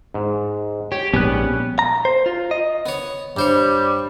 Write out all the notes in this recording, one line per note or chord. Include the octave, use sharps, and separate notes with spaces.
G#2
G4 C#5
A#1 G#2 G3 B3 C#4 F#6
A#5
C5
F4
D#5
B3 C#5
G2 G3 C5 C#5